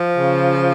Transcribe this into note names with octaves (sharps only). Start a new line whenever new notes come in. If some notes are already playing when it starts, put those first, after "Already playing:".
Already playing: F3
C#3